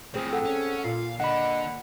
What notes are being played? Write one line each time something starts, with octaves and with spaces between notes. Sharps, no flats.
A2 F3 C4 G#4
A4 F#5
C#4
A#2 F4 F5
D3 D#5 F#5 B5